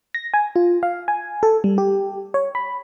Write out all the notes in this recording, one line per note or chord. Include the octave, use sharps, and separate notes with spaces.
A#6
G#5
F4
F5
G#5
A4
G3
G4
C#5
B5